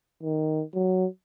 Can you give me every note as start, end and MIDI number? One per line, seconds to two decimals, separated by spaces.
0.23 0.63 51
0.74 1.06 54